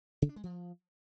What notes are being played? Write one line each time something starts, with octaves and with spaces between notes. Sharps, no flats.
C#3
D4
G#3
F3